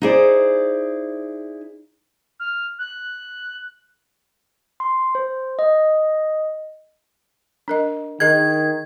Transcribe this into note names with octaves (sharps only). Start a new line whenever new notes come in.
D#4 E4 G#4 C5 D5
F6
F#6
C6
C5
D#5
D4 A#4 D#5
D#3 G#4 A#4 D#5 G#6